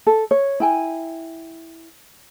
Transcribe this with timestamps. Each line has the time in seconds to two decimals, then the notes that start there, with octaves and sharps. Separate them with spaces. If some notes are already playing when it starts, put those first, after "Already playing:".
0.07 A4
0.31 C#5
0.60 E4 G5 G#5